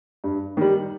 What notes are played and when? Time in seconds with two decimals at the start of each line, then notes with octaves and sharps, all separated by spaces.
0.24 G2
0.57 D#3 G3